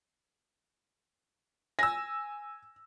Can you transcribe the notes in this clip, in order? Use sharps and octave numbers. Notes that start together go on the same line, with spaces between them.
G#5 E6 A#6